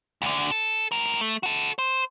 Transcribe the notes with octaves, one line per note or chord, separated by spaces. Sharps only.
D2 D3
A4
A2 A#4
A3
F#4 A4
C5